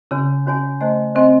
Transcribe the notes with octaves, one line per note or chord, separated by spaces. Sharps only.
C#3 C#4 F#4 C#5 G#5
C#4 F#4 C#5 G#5
A3 C5 D#5 G#5 C6
C4 C5 D#5 G#5 C6